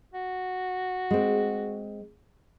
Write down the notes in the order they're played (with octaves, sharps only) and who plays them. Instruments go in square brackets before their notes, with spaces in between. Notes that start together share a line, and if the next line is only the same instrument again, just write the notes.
[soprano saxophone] F#4
[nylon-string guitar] G#3 C4